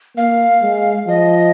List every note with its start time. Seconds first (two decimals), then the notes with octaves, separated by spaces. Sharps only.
0.17 A#3 F5
0.62 G#3
1.08 F3 D#5